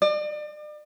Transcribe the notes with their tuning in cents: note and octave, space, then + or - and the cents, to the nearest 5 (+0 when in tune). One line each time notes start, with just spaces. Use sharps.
D5 +40